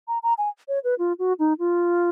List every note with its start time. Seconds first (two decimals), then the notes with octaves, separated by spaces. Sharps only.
0.08 A#5
0.23 A#5
0.38 G#5
0.68 C#5
0.84 B4
0.99 F4
1.19 F#4
1.39 D#4
1.59 F4